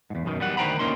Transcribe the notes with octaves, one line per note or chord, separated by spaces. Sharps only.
E2 G#2
F#2 B2 D#3
G3 B3 F#5
D2 D#3 C5 G5 A#5 B5
D2 B2 A#3 C#4 D#4 C6